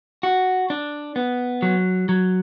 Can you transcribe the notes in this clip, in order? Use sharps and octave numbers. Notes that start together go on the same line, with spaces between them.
F#4
D4
B3
F#3
F#3